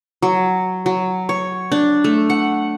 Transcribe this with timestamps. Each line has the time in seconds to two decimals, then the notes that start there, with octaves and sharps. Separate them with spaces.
0.22 F#3
0.86 F#3
1.29 C#5
1.72 D4
2.04 A3
2.30 F#5